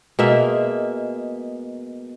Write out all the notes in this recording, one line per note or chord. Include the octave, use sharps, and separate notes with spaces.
B2 G#3 A#3 E5